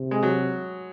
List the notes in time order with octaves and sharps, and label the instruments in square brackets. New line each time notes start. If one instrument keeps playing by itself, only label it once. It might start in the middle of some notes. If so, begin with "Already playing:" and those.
Already playing: [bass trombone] C3
[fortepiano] G#3
F#3